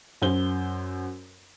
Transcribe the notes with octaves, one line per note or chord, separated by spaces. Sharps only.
F#2 C5 G7